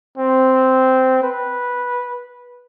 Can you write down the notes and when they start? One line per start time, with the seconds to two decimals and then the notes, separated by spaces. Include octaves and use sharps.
0.17 C4
1.22 B4